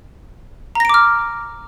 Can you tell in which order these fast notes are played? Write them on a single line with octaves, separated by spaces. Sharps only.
A#5 A#6 D7 D6 F6